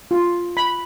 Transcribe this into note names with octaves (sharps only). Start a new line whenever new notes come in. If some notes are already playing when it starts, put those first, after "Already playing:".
F4
B5